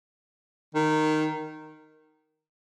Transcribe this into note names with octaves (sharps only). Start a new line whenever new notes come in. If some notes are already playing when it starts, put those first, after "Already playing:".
D#3